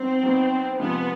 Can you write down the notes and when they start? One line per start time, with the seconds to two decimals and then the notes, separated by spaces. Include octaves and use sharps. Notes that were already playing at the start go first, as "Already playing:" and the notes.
Already playing: F#3 B3 C4 D#4
0.23 F#3 B3 D#4
0.79 C3 F3 G#3 B3 C4